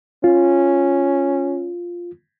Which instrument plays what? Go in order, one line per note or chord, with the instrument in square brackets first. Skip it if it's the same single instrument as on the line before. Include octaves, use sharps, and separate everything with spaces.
[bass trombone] C#4 [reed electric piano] F4